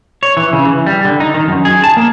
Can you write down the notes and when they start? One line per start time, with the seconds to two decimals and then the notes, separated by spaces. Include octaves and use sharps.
0.23 C#5
0.37 E3
0.53 C#3
0.65 E3
0.86 G3
1.05 D3
1.20 D#4
1.34 D#3
1.48 F#2
1.65 G#4
1.84 A5
1.97 A#3